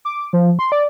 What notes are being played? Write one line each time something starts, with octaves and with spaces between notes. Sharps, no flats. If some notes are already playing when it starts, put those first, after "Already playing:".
D6
F3
C6
D5